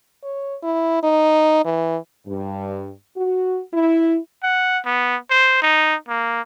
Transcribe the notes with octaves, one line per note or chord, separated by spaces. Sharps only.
C#5
E4
D#4
E3
G2
F#4
E4
F#5
B3
C5
D#4
A#3